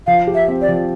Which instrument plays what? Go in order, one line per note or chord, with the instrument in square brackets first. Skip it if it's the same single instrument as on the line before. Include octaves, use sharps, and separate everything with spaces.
[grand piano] F3 [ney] F5
[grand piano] G4
[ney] E5
[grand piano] C4
[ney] D5
[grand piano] F3